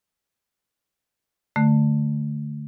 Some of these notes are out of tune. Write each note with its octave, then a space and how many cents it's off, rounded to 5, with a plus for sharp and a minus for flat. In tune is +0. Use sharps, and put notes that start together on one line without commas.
D3 +0 A3 +0